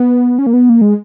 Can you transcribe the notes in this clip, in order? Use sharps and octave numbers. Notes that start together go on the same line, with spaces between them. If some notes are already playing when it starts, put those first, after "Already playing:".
Already playing: B3
C#4
A#3
B3
A#3
G#3